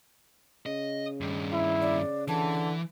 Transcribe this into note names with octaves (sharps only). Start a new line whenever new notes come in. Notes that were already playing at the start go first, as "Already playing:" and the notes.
C#3 D#5
G2 D#3
E4
D5
D3 E3 A5